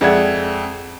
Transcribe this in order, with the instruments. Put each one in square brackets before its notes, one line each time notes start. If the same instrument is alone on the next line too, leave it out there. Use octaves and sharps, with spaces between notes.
[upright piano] F2 G#3 D5 E5 F#5 G#6